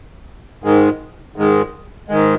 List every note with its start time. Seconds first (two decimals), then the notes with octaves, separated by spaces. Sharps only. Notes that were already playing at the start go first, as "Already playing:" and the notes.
0.64 G#2 D#3 G#3
1.36 G#2 D#3 G#3
2.09 G#2 D#3 G#3